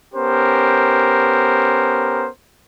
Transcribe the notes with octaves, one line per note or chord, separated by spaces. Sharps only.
B3 C#4 G4 A#4 C5